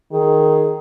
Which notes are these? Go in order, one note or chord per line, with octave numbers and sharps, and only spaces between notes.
D#3 G#4